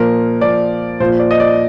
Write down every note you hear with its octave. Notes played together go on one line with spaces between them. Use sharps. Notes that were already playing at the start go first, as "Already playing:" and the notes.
Already playing: A#2 F3 A#4
A#2 F3 D5
A#2 F3 C5
D5
D#5
D5